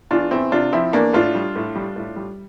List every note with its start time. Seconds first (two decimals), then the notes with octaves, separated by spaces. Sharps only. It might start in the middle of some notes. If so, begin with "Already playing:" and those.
0.11 E2 D4 F4
0.31 E2 C4 E4
0.52 C3 D4 F4
0.73 F3 C4 E4
0.93 E2 A#3 D4
1.13 A2 D4 F4
1.35 G3
1.56 A2
1.75 G3
1.96 A2
2.16 G3